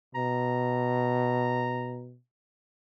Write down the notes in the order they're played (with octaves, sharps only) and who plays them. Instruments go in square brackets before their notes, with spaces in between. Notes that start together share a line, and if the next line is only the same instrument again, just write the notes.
[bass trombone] B2 [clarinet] A#5